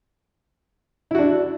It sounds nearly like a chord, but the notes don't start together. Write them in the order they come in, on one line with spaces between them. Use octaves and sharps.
E4 F#4 D4